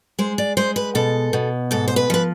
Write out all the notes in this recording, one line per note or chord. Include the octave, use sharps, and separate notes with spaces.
G#3 C5
D5
G#3 C5
B4
B2 A4
B2
G#2 A4
C5
B4
F3 B4